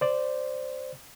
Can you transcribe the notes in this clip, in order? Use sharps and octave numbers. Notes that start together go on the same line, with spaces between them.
C5 D5